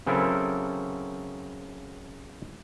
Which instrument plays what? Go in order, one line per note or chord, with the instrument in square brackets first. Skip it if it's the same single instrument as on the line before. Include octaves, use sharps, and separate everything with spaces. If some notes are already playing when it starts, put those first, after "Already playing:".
[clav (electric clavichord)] C#3 F#3 C4 E4 A4 A#4